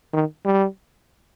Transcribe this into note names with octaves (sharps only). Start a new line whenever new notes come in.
D#3
G3